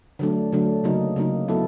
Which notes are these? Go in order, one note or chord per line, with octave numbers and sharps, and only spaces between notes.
D3 F#3 A3 D4
D3 F#3 A3 D4
C#3 F#3 A#3 D#4
C#3 F#3 A#3 D#4
F#3 B3 E4 A4